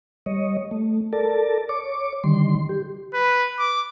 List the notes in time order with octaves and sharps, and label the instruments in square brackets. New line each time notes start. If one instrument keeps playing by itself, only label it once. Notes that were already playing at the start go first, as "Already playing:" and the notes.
[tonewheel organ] G3 C#5 D#5
A3
A4 A#4 D5 A5
C#5 D6
D3 D#3 G3 C6
G4
[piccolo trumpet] B4
D6